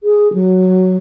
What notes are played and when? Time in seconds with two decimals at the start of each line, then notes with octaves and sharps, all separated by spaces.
0.03 G#4
0.33 F#3